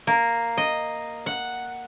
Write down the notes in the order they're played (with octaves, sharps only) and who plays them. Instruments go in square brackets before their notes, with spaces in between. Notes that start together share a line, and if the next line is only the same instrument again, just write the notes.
[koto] A#3
D#5
F#5